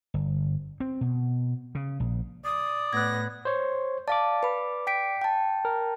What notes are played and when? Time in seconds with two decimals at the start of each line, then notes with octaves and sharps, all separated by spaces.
0.14 G1
0.80 C4
1.01 B2
1.75 C#3
2.00 A#1
2.45 D5 D#6
2.93 A2 B3 F#6 G#6 A#6
3.45 C5 C#5
4.08 D5 F5 A5 D6
4.43 B4 B5
4.87 G5 B6 D7
5.21 G5 A5
5.65 A#4